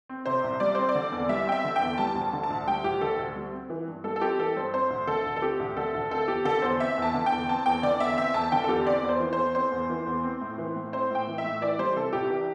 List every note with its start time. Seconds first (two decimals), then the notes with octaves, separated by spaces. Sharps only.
0.09 C4
0.26 C3 C5
0.44 C2
0.60 G3 D5
0.75 C4 C5
0.89 D5
0.95 D3
1.12 E2
1.29 G3 E5
1.47 C4 G5
1.52 E5
1.64 D3
1.76 G5
1.81 E2
1.98 G3 A5
2.15 D2
2.22 A5
2.33 D3
2.43 A5
2.50 D2
2.67 G3 G5
2.84 D2 G4
3.01 D3 A4
3.19 D2
3.36 G3
3.53 C4
3.70 E3
3.87 G2
4.04 G3 A4
4.16 A4
4.21 C4 G4
4.39 E3 A4
4.56 G2 C5
4.73 C4 C5
4.90 D2
5.07 D3 A4
5.26 D2
5.36 A4
5.42 C4 G4
5.60 D2
5.77 D3 A4
5.94 D2
6.11 C4 A4
6.28 E2 G4
6.45 D3 A4
6.62 E2 C5
6.80 C4 E5
6.97 E2 A5
7.14 D3
7.26 G5
7.32 E2
7.49 C4 A5
7.66 E2 G5
7.83 D3 D5
8.00 E2 E5
8.18 C4 E5
8.34 E2 A5
8.52 D3 G5
8.64 A4
8.69 E2 G4
8.87 C4 D5
9.03 E2 D5
9.09 C5
9.20 E3
9.33 E2 C5
9.55 C4 C5
9.72 E2
9.90 E3
10.06 E2
10.23 C4
10.41 A2
10.58 E3
10.76 A2
10.93 C4 C5
11.10 A2 G5
11.27 E3
11.38 E5
11.44 A2
11.62 E3 D5
11.79 G3 C5
11.96 C3 A4
12.13 C2 G4
12.30 E3 G4